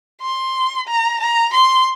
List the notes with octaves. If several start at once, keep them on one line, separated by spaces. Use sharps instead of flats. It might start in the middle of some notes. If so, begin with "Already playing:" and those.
C6
A#5
A#5
C6